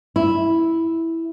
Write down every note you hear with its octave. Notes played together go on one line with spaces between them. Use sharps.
E4